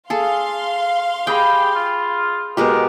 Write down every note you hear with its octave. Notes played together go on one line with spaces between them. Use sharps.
G#4 A4 F5 C6
G4 G#4 D#5 G5 B5
F4
B2 G#3 G4 A#4